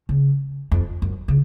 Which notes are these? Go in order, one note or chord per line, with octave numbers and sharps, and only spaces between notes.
C#3
F2
F#2
C#3